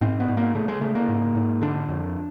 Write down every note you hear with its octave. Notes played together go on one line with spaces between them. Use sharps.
G#2 C4
B3
G#2
A#3
C#3 A3
G#3
C#3 A3
A#3
G#2
G#2
D3 D4
F2